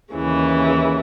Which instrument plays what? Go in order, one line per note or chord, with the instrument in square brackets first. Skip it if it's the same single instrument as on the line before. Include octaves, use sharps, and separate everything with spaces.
[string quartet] D#2 C#3 E3